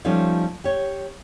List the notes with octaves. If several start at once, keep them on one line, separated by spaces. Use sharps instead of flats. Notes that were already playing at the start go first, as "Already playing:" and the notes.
F3 G3 A3 C#4 D#4 F4
G4 C#5